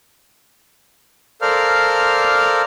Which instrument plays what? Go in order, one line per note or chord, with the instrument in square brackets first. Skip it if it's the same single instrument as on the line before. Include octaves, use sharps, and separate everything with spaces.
[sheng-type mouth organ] A4 A#4 C5 D5 F5 F6